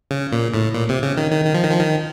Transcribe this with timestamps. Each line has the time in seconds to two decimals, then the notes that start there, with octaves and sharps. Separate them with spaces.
0.11 C#3
0.32 A#2
0.54 A2
0.74 A#2
0.89 C3
1.03 C#3
1.17 D#3
1.31 D#3
1.45 D#3
1.54 F3
1.64 D#3
1.71 F3
1.81 D#3